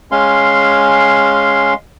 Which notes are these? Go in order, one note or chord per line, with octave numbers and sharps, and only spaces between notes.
G#3 C#4 F5 C6